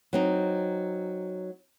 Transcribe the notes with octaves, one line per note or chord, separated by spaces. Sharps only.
F#3 C4 D#4